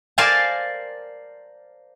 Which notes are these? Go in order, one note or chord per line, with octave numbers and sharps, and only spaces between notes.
A#4 C5 D5 F5 G#5 A5